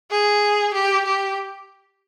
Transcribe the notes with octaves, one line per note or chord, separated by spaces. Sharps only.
G#4
G4
G4